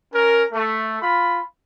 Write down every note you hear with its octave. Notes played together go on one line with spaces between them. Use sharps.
C#4 A#4
A3
F4 B5